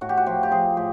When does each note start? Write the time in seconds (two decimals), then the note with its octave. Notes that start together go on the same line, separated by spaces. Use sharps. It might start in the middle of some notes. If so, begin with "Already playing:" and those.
0.01 A2 F#4
0.09 G4
0.17 F#4
0.26 F3 G4
0.43 G4
0.51 F3 G#4
0.77 A2 G4